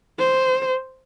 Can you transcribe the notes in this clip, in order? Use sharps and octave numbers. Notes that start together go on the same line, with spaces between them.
C5